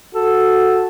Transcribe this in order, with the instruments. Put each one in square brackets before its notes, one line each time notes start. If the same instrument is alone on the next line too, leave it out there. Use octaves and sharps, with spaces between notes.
[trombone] F#4 [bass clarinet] A4